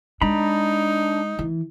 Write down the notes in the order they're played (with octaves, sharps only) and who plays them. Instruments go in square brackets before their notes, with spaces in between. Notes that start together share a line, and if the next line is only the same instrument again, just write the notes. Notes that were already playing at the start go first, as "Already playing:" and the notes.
[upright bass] G#3 [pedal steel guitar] D4 A#5 B5 [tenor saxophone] D#4
[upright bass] E3